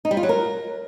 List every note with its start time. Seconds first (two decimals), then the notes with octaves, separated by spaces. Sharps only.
0.05 D#4
0.11 G3
0.17 F4
0.23 F#3
0.29 A#4